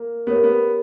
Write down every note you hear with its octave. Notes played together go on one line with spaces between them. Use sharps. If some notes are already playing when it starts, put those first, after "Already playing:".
Already playing: A#3
B3 G4 A#4 C#5
A#3
B3